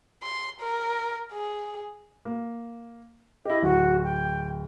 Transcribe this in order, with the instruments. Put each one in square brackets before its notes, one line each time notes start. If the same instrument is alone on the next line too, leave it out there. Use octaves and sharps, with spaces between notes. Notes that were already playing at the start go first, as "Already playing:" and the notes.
[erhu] C6
A#4
G#4
[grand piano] A#3
[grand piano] E4 G4 [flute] D#5
[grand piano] D1 [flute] F#4
[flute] G5